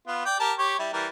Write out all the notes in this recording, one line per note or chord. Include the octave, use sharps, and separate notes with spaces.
B3 F4
D5 G5
G4 A#4 A5
G4 C#5
G3 E4
E3 G3 A#4